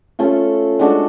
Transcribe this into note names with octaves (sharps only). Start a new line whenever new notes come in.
A3 C#4 F4 A4
G#3 D4 F#4 A4